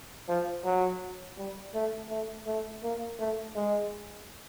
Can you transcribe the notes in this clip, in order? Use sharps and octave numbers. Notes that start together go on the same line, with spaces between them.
F3
F#3
G3
A3
A3
A3
A#3
A3
G#3